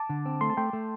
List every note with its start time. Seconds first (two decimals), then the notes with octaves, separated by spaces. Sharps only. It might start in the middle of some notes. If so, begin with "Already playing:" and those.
Already playing: A5 D6
0.09 D3
0.26 C4
0.41 A3 C6
0.50 A5
0.57 A3 G5 C6
0.73 A3